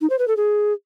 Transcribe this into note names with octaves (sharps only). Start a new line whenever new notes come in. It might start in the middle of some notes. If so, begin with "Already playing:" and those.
D#4
C5
B4
A4
G#4